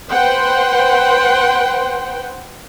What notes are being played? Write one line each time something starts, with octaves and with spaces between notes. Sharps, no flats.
B4 C5 F#5 G5 C6